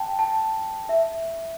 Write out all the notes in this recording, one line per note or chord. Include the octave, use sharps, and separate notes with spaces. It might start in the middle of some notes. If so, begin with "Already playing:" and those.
Already playing: G5 A5
A5
E5